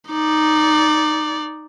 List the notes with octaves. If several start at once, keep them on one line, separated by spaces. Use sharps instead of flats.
D#4 D5